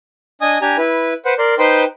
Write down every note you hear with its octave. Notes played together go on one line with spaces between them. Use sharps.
D4 D#5 G#5 D#6
D4 G4 G#5 A#5
E4 B4
B4 C5 F#5
A#4 D5 C6
D#4 B4 C5 G5 C6